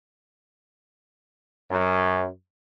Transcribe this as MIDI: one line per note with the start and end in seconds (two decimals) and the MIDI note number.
1.70 2.27 42